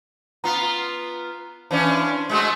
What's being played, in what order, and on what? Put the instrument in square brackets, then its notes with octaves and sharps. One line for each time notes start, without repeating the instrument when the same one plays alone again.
[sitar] B3 F4 [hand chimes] A#5 B6
[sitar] E3 C#4 D4 [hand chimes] C5 F5 A5
[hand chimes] D5 C6
[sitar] G#3 A3 F#4